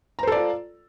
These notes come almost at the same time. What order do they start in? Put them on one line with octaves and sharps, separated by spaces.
A#5 C5 A4 D5 F4